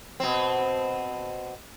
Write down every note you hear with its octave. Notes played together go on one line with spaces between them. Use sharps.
B2 C4